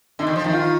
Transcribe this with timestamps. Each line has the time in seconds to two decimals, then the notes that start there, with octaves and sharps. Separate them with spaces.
0.19 D3 D#4
0.27 D#3
0.36 F3
0.44 D#3 D#4
0.53 F4